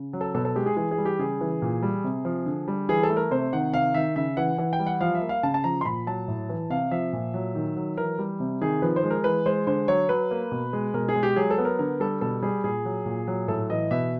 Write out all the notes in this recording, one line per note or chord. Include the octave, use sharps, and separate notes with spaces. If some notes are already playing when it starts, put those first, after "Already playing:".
Already playing: C#3
F#3
A4
B2 A4
A4
G#3 G4
G#4
E3 G#4
G#4
G3
G4
C#3 G#4
E3
A#2
G3
C3
F3
D3
G3
E3 G#4
A4
A3
A#4
C3 C5
D#3 F#5
C3 F5
D#3 E5
C#3 E5
E3 F#5
E3 F#5
G5
G3
F#5
F3 F5
E5
A#3
F5
C#3 A5
A5
F3 A#5
C6
A#2 B5
F#3 A5
A2
E3
C3 F5
F3 E5
A#2
F#3
D#3
F#3
E3 A#4
G3
C3
D#3 G#4
F3 B4
C5
G#3
A#4
E3 B4
G#3 C5
D3 C5
F#3 C#5
F#3 B4
A#3
B2
G#3
B2 A#4
G#4
G#3
G4
F#3 G#4
A4
B3
A#4
D3 A#4
G3 A4
B2 A4
G3 G#4
A#2 G#4
F#3
A#2
F#3
A2 A4
E3 D#5
B2 E5